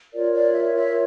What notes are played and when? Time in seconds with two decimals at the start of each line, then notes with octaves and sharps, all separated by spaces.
0.12 F4 A#4 C#5 D5
0.33 D5
0.54 E5
0.75 E5